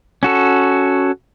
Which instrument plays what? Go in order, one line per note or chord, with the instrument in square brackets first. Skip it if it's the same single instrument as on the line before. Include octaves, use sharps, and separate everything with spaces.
[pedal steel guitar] C#4 F#4 A4